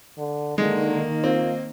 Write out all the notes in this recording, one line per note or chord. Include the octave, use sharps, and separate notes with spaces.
D3
D3 D#3 G#3 A#3
C4 F4